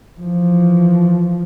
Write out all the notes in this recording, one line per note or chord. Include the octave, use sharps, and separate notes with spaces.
E3 F3